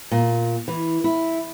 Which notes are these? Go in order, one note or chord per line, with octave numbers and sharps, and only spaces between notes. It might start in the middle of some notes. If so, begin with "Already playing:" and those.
A#2
E3
E4